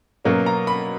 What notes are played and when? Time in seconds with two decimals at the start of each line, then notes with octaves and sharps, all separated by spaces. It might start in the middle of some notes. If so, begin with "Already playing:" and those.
0.25 B2 F#3 A#3 C#4
0.46 A#5
0.67 B5